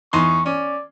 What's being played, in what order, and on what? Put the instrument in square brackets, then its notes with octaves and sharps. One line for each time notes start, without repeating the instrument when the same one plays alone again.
[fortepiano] E2 D#4 C6 [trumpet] C#6
[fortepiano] C#4 [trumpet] D5